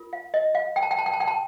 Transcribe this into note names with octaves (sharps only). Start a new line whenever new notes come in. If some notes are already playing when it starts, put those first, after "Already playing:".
Already playing: F4 A#4
F5
D#5
F5
G5
A5
G5
A5
G5
A5
G5
A5